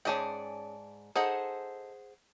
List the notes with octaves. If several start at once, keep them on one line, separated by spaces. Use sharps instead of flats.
G#2 C#4 G#4 D5 G5 A5
D#4 G#4 A4 C5 F#5